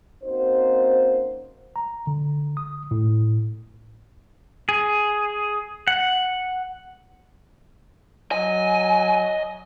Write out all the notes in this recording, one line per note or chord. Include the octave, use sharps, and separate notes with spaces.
A#3 C4 C#4 D#4 F#4 C5
A#5
D3
D#6
A2
G#4
F#5
F#3 D#5 G#5